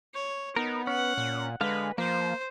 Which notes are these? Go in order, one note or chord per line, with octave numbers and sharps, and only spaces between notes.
C#5
B3 D#4 A#4
C#4 F#5
A#2
D3 G#3 B4 F5
F3 A#3 C5